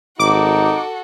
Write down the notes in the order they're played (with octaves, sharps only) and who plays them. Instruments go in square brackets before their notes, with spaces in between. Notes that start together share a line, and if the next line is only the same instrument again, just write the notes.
[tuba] G#1 [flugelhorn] D#4 [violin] F#4 A4 [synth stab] D6